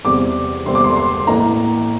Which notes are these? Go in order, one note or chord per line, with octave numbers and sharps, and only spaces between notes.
E2 C3 G3 C4 D6
E2 C3 G3 C4 C6
D6
C6
C6
A1 A2 E3 A#3 A#5